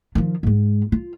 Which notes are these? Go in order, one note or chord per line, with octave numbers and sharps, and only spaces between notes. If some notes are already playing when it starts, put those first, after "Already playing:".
D#3 F3
G#2 G#3
F4